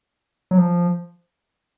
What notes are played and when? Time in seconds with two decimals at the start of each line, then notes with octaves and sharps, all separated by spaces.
0.51 F#3
0.58 F3